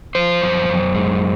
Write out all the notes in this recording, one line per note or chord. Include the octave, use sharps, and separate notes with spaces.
F3 C5
F#2
F#2
G#3